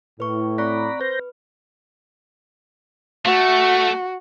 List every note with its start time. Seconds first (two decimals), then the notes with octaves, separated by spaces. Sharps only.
0.20 A2 B4 C#6
0.58 C4 D5 A#5 B5 C#6 F#6
1.01 B4 C5 G6 A#6
3.25 A3 F#4